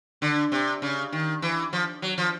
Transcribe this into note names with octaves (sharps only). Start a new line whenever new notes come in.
D3
C3
C#3
D#3
E3
F3
F#3
F3